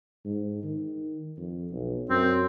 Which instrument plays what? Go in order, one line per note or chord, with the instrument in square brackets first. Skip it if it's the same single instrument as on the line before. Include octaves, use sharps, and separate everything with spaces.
[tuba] G#2
D#3
F2
B1
[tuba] F#2 [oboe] C4